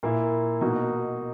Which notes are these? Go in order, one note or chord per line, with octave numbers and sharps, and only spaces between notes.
A#2 A#3 E4
B2 A#3 D#4 F#4